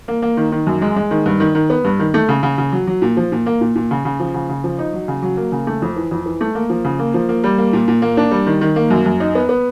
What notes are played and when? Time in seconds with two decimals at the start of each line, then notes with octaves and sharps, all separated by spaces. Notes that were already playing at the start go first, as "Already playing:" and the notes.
0.08 A#3
0.22 A#3
0.37 D#3
0.52 D#3
0.67 F#2
0.82 G#3
0.96 G#3
1.11 D#3
1.26 G2
1.40 D#3
1.55 D#3
1.70 B3
1.84 G2
1.99 D#3
2.14 A3
2.29 C#3
2.43 C#3
2.58 C#3
2.72 F#3
2.87 F#3
3.02 A#2
3.17 F3
3.32 A#2
3.46 A#3
3.61 A#2
3.76 A#2
3.91 C#3
4.05 C#3
4.20 F3
4.34 C#3
4.49 C#3
4.64 F3
4.79 D#4
4.93 F#3
5.08 C#3
5.22 F#3
5.37 A#3
5.52 C#3
5.67 A3
5.82 F2
5.96 E3
6.11 F2
6.26 E3
6.41 A3
6.55 A#3
6.70 F3
6.85 C#3
6.99 A#3
7.14 F3
7.29 A#3
7.44 G3
7.58 A#3
7.73 A#2
7.88 A#2
8.02 A#3
8.17 D4
8.31 G3
8.46 D#3
8.61 D#3
8.76 A#3
8.90 F#2
9.06 F#2
9.20 D#4
9.35 B3
9.49 B3